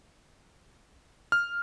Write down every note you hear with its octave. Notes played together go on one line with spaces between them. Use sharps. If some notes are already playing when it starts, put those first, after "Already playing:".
F6